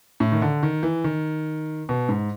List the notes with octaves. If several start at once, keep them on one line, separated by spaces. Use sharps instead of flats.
A2
D#3
D3
D#3
E3
D#3
B2
G#2